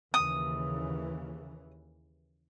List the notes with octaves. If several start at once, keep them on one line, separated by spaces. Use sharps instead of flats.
D#2 C#3 E3 D#6